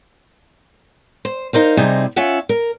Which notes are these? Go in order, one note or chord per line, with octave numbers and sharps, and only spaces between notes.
C5
D#4 A#4 C5 F5
C3 G3 D#4 G#4 C5
C#4 F4 E5 F#5
A#4